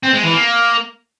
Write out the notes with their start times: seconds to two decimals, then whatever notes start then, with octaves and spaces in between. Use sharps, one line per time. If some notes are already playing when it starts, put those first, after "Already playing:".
0.03 C4
0.13 G#3
0.23 E3
0.33 A#3